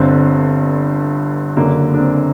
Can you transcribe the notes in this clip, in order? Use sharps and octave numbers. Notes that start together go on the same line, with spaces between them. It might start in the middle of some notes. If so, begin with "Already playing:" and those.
Already playing: G1 G2 D3 C4
F#1 F#2 D3 A#3
D4
C4